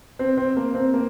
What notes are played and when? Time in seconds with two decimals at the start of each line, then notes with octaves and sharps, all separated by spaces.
0.19 C4
0.37 C4
0.57 A#3
0.75 C4
0.94 A#3